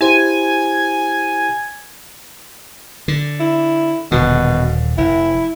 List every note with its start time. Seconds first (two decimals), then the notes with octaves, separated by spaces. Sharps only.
0.01 E4 G4 C5 G#5
3.08 D3
3.40 E4
4.12 D#1 B2 D3
4.98 F1 E4